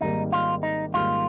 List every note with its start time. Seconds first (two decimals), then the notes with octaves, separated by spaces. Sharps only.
0.01 G#1 G#2 D#3 G3 A#3 D#4
0.32 F4
0.63 D#4
0.94 G#1 G#2 D#3 G3 A#3 F4